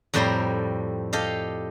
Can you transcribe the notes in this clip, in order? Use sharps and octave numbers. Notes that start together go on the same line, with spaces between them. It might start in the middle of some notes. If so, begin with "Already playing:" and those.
F2 A2 G3 C5 D5 A#5
G4 A4 D#5 F5